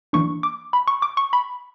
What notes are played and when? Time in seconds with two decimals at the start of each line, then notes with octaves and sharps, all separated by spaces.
0.13 E3 A#3 D4 C#6
0.43 D6
0.73 B5
0.88 C#6
1.02 D6
1.17 C#6
1.33 B5